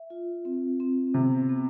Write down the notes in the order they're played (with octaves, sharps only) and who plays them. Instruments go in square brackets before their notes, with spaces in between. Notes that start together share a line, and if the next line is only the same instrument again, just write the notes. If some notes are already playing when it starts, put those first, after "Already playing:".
Already playing: [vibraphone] E5
F4
C4
C4
[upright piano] C3 [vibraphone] B3
[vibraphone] B3